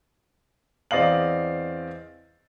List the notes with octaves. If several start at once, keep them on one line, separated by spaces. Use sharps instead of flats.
E2 C4 D5 D#5 F5 F#7